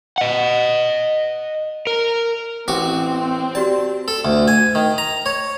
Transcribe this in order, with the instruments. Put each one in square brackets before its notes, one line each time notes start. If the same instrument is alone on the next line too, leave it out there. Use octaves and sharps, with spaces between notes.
[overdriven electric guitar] D#5 F#5
A#4
[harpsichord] A1 F#4 D6 [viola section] C4
[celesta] F#4 G4 D5 [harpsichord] A5
[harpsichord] A4
D2
G#5
D#3
A#5
C#5